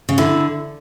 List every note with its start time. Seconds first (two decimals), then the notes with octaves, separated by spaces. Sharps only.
0.09 C#3
0.18 D3 E4